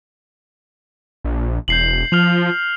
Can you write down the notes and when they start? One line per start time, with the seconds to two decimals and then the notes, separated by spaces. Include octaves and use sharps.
1.24 A#1
1.68 E1 G6 C7 F#7
2.12 F3 F6 F7 F#7